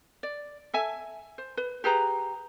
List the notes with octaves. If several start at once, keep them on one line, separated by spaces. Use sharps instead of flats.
D5
A4 E5 G#5
C5
B4
G4 G#4 B4 A#5